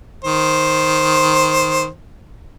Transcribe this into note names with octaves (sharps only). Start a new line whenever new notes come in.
D#3 C5